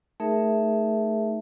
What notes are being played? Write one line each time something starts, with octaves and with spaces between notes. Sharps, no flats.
A3 D#4 G#4 A#4 E5